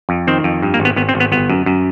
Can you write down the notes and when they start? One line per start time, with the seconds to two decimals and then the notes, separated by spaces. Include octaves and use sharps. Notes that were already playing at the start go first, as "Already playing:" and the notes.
0.09 F2
0.27 D#3 C4
0.44 F2
0.62 G2
0.74 A#3
0.80 G#1
0.85 B3
0.96 G#1 B3
1.09 C4
1.15 G#1
1.20 B3
1.32 G1 B3
1.50 F#2
1.66 F#2